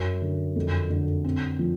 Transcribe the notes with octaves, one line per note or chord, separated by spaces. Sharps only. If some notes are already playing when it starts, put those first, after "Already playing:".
Already playing: F#2
D3
F2
D3
C4
F3